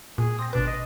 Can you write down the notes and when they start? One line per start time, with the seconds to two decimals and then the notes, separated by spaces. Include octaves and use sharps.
0.18 A#2 G#4
0.39 C4 D#6 A#6
0.53 G#1 B2 D4 B4
0.67 D#5